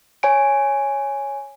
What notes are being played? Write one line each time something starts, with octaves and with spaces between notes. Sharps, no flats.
C#5 G#5 D7